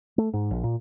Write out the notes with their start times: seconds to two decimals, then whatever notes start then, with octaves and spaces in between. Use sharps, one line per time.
0.18 A3
0.33 G#2
0.51 A#1
0.64 A#2